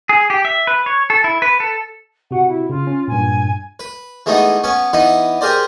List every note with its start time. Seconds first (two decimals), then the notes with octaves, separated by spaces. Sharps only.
0.09 G#4
0.30 G4
0.45 E5
0.67 B4
0.86 C#5
1.10 A4
1.24 E4
1.42 B4
1.60 A4
2.31 C3 F#4 F#5
2.48 E4
2.70 C#3 F4
2.87 C#4
3.08 G2 A#2 G#5
3.79 B4
4.26 E3 G#3 A3 B3 D#4
4.64 B3 C#4 C#5
4.93 E3 B3 D#4 B4
5.41 G4 G#4 A#4 C5 D5